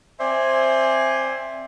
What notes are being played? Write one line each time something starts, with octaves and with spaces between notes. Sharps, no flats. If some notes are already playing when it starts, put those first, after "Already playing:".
C4 C5 D5 E5 G#5